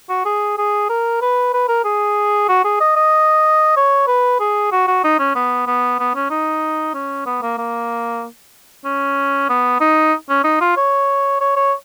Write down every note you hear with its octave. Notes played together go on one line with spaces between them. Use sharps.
F#4
G#4
G#4
A#4
B4
B4
A#4
G#4
F#4
G#4
D#5
D#5
C#5
B4
G#4
F#4
F#4
D#4
C#4
B3
B3
B3
C#4
D#4
C#4
B3
A#3
A#3
C#4
B3
D#4
C#4
D#4
F4
C#5
C#5
C#5